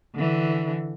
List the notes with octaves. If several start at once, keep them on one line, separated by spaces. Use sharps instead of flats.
D3 E3